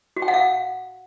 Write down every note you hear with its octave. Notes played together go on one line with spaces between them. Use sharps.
F#4
G5
F#5
F5